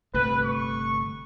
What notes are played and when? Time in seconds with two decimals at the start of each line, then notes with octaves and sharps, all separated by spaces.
0.14 G1 C3 A3 B4
0.45 C#6